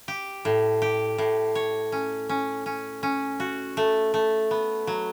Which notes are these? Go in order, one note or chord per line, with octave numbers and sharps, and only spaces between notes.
G4
A2
G4
A2
C#5
C#4
C#4
C#4
C#4
F#4
A3
A3
B3
F#3